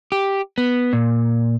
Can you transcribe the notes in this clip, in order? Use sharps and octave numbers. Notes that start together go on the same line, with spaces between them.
G4
B3
A#2